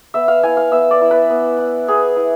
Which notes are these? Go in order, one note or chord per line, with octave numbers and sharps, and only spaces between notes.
B3 E5
F5
E4 G#5
F5
B3 E5
D5
E4
B4
B3
E4
B3 G#4
E4